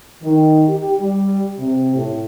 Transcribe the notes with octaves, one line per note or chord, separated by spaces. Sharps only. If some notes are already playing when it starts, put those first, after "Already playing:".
D#3
G4
G3
C3
A2